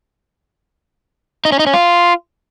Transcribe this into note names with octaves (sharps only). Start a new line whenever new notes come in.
D#4
C#4
D#4
C#4
F4